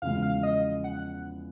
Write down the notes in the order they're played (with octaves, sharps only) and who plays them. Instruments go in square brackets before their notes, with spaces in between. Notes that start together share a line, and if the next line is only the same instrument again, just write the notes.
[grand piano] E2 C#3 F3 G#3 [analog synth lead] F5
[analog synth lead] F5
D#5
F#5